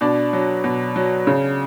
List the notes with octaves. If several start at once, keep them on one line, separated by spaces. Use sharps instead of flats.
B2 D4 D5
F#3
B2
F#3
C#3